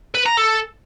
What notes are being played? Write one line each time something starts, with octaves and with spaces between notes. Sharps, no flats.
B4
A#5
A4